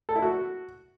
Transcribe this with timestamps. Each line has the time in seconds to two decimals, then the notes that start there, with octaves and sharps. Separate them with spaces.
0.09 A4
0.16 E4
0.22 F#4